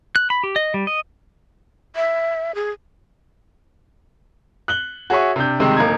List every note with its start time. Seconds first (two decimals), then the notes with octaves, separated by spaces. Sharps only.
0.16 F#6
0.30 B5
0.44 G4
0.56 D#5
0.74 G3
0.87 D#5
1.96 E5
2.55 G#4
4.68 F#6 F#7 G7
5.10 F#4 G#4 C#5 E5 G#5 C#6
5.36 C3 D4 G6
5.60 C3 D#3 G3 G#3 C4
5.77 D1 A#3 D#4 A#5 G#6